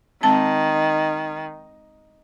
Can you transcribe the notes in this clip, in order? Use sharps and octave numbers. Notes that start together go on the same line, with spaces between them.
D#3 G#3 C4 A5